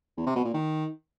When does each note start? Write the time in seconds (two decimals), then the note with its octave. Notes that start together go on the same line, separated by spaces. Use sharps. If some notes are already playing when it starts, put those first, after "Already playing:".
0.17 E2
0.26 C3
0.35 B2
0.44 A#2
0.54 D#3